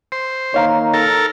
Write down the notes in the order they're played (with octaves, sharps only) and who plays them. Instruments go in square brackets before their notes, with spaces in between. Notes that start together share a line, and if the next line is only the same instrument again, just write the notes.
[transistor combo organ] C5
[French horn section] D#3 A#3 D#4 [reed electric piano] C#5 F5 A#5
[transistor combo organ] A4 A#4